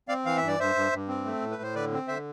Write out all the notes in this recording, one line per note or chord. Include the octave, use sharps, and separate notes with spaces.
C4 D5 F5
E3 F5
E5
G2
D5
G2 C5 E5
G2
G2
C4
A3
A2
B4
A2 C5
D3 B4 D5
C4
D3 C5 E5